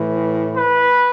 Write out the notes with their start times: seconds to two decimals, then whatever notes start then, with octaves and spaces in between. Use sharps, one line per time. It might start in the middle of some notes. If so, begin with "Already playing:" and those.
Already playing: A2 E3
0.57 B4